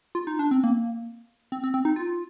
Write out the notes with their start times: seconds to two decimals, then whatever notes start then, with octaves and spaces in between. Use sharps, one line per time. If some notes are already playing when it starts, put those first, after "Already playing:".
0.15 F4
0.27 D#4
0.39 D4
0.51 C4
0.64 A#3
1.52 C4
1.64 C4
1.74 C4
1.85 D#4
1.96 F4